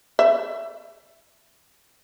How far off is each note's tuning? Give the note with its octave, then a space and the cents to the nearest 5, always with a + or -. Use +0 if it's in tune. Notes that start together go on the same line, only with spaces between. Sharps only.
E5 +15